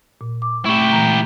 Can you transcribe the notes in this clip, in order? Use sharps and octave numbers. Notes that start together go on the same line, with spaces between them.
A#2
D6
A3 E4 G4 C#6
A#2 E3 A#5